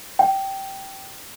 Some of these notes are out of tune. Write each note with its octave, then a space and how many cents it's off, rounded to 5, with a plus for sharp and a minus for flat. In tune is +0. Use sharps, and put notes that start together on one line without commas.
G5 -10